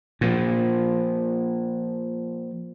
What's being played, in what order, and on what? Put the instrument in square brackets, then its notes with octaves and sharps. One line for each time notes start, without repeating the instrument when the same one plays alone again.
[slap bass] A#2 F3